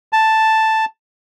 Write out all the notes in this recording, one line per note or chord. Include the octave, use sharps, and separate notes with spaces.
A5